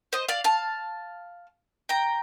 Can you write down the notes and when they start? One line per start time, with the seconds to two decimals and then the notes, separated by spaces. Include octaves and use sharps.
0.13 C5 D#5
0.29 D5 F5
0.44 F5 A5
1.89 G5 A#5